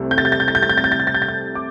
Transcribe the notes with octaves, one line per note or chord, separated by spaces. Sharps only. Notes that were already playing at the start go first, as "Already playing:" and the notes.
Already playing: C2 C3 A3 C4 E4
G6
A6
G6
A6
G6
A6
G6
A6
G6
A6
G6
A6
G6
A6
G6
A6
G6
D6